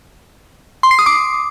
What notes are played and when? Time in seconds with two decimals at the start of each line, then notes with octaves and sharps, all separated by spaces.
0.83 C6
0.91 C7
0.99 D#6
1.06 D6